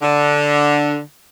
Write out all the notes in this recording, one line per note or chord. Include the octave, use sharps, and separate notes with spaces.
D3